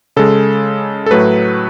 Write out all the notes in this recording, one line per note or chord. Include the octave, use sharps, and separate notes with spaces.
C#3 G#3 A4
A4
A2 F#3 A3 B4